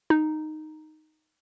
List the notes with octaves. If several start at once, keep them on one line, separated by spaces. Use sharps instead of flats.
D#4